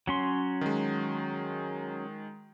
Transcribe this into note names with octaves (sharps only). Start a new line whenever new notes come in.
F#3 C#4 C6
D#3 G#3